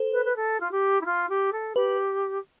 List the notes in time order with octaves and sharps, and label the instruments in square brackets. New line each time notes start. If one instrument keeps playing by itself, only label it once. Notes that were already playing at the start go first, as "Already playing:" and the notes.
Already playing: [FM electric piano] A4 C5
[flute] B4
B4
A4
F4
G4
E4
F4
G4
A4
[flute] G4 [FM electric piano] B4